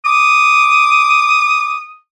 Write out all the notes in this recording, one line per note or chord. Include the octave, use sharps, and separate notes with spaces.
D6 D#6